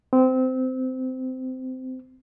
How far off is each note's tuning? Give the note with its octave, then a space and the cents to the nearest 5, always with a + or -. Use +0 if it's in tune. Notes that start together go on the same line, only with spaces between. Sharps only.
C4 -20